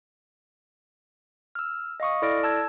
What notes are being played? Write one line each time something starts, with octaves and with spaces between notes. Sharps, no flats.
E6 F6
D#5 F5 C#6 D#6
E4 A4 D5 F6 A#6 D7
A5 E6 G#6